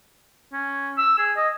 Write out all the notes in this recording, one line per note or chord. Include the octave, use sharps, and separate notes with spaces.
C#4
E6
G#4
D#5